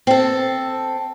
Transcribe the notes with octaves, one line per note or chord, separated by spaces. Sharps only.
C4 A4